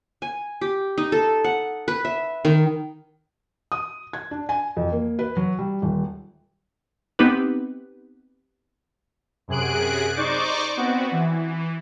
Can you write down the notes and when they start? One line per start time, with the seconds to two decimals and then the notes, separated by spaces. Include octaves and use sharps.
0.22 G#5
0.61 G4
0.98 D#4
1.12 A4
1.44 F#5
1.88 B4
2.05 E5
2.45 D#3
3.72 D#6
4.13 G#6
4.31 D4
4.49 G#5
4.77 F2
4.92 A#3
5.19 B4
5.37 F#3
5.59 G3
5.82 D#1
7.19 B3 C4 D#4 G4 B4
9.48 F#2 C3 G#4 F#6 D7
10.16 D#4 C5 D5 C#6 D6
10.77 B3 C4 F#4
11.12 E3